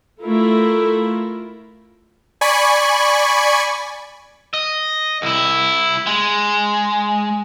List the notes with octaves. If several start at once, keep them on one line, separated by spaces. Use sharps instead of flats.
A3 E4 F4 A4 A#4
D5 G#5 B5 C#6
D#5
C2 E4
G#3